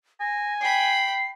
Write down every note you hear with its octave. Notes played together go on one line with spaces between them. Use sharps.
G#5 A#6
G5 B5 C7